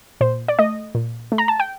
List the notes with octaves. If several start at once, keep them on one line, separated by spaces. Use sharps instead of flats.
A#2 C5
D5
A3 D#5
A#2
A3
A#5
A5
G5